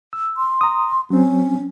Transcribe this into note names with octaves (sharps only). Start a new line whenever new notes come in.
E6
C6
A#5 D#6
F#3 C4 C#4